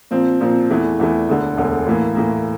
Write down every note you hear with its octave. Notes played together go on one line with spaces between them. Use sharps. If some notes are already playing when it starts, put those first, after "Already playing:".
A#2 F3 C4
A#2 F3 C4
E2 E3 A3
E2 E3 A3
E1 D2 D3
E1 D2 D3
A2 E3 A#3
A2 E3 A#3